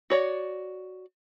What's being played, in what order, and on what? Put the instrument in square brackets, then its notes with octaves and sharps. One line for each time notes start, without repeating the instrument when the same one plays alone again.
[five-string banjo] F#4 C#5 D5